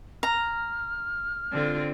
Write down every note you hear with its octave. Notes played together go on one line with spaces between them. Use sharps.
A#5 F6
D3 C4 F4